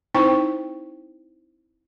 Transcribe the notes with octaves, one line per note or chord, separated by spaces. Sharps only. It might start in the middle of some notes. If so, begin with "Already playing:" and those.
C4 D#4 E4 C5 G5 C#6